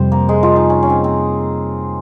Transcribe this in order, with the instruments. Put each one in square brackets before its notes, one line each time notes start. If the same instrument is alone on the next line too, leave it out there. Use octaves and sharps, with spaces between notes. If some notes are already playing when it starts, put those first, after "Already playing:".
Already playing: [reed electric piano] F2 C3 G3 [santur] C4 C5
[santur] A#3 A#4
G#3 G#4
F3 F4
D#4
C#4
C#4
C4
C4